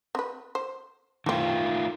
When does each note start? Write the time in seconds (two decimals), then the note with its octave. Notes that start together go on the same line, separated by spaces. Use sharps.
0.15 C4 B4
0.55 C5
1.26 D#3 E3 A3 C4 F4